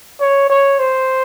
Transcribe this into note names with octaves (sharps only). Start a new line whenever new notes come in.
C#5
C#5
C5